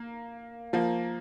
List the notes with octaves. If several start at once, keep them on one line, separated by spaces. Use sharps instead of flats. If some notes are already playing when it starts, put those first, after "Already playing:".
Already playing: A#3
F3 A#3